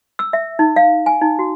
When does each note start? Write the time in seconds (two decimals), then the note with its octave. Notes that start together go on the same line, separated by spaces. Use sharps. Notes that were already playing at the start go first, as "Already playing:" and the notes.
0.19 E6
0.33 E5
0.59 D#4
0.76 F5
1.06 G#5
1.21 D#4
1.39 F#4